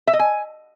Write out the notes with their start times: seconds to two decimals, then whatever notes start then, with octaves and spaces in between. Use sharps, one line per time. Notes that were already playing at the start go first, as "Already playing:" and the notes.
0.07 E5
0.13 D#5
0.19 G#5